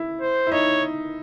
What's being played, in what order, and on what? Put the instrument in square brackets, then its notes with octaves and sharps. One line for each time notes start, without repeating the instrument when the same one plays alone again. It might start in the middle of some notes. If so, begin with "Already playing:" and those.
Already playing: [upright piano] E4
[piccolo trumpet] C5
[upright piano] E4
[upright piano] D#4 [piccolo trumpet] C#5